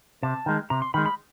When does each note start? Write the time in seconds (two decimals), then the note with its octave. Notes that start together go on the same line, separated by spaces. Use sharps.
0.23 C3 A5
0.46 D#3 G#3
0.70 C3 A#5
0.82 C6
0.94 D#3 G#3 B5
1.06 B5